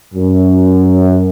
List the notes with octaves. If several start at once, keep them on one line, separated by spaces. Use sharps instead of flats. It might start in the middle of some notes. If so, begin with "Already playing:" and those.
F#2